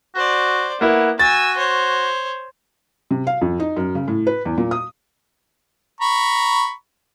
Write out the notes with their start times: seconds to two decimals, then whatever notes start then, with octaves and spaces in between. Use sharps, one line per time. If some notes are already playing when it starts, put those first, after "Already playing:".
0.15 F#4 C5 D5
0.81 A#3 B3 E4 F#5
1.19 F#4 G#5 E6 A6
1.57 C5 C#5
3.11 C3
3.27 F5
3.41 F2
3.60 D#4
3.77 F#2
3.95 C#3
4.08 A2
4.27 B4
4.45 E2
4.58 A#2
4.71 D#6
6.01 A#5 B5 C#6